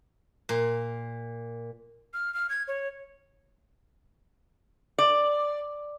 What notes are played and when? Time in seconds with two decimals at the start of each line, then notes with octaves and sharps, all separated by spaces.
0.49 A#2
2.14 F6
2.34 F6
2.50 G#6
2.68 C#5
4.98 D5